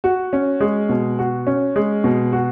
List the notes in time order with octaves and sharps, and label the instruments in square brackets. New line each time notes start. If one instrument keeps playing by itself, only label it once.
[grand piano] F#4
C#4
G#3
B2
F#4
C#4
G#3
B2
F#4